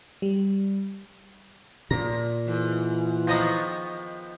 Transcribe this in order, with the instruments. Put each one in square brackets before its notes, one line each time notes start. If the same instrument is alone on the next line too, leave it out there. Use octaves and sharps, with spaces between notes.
[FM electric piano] G3
[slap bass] A#2 [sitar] F3 [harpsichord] A#5
[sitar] G#2 [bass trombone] E3
[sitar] D#3 B3 [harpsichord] F3 D#5 A#5